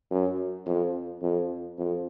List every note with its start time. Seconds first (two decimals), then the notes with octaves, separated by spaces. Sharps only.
0.11 F#2
0.66 F2
1.22 F2
1.78 F2